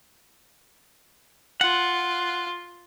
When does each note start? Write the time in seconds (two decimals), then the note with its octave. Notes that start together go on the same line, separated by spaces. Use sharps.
1.61 F4 F#5